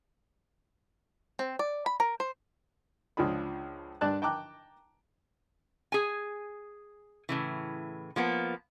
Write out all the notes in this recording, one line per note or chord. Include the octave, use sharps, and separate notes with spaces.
C4
D5
B5
A#4
C5
C#2 F3 D4 G#4 B5
G2 D4 D5 A5 F#6
G5 A5 A#5 D6 F#6
G#4 G#5
A2 C#3 E3
F3 A#3 B3